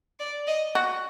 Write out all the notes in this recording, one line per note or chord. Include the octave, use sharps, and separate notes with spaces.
D5
D#5
F#4